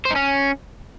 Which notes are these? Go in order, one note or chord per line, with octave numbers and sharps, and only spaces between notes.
C5
D#4
C#4